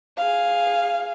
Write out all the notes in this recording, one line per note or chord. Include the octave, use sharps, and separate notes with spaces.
G#4 F5